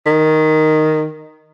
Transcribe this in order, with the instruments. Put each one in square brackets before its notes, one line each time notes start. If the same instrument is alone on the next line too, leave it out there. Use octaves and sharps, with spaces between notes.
[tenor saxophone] D#3